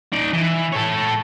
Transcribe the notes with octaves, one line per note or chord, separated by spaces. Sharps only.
D#4 D5
E3
A4 C#5